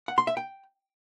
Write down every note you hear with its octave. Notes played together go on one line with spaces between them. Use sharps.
F#5
C6
E5
G5